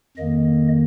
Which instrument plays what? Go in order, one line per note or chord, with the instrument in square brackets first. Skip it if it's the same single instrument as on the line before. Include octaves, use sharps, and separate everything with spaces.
[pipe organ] F2 D#3 A#3 D#5